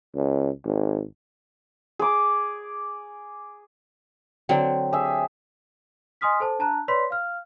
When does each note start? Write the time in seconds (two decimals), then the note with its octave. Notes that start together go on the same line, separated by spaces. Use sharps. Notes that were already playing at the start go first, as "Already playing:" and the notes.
0.15 C#2
0.64 G#1
1.99 G#4 D6
4.49 D3 F#3 C4
4.92 G4 G#4 E5
6.21 D#5 G#5 C6 D#6 F6 B6
6.40 A4 C5 A5
6.59 D4 A5 A#5 F#6
6.88 B4 C#5 D5 B5 C6 B6
7.10 F5 F6